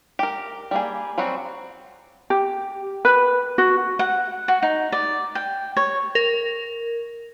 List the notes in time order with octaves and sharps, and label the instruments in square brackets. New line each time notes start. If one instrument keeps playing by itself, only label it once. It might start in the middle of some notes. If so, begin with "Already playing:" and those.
[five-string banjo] G4 A#4
G3 A#3 G#4
F#3 G3 C4 F#4
[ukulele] G4
B4
F#4
[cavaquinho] F#5
F#4
D#4
D5
G5
C#5
[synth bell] A#4